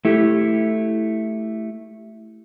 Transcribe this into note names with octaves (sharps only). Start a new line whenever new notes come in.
A3 E4 G4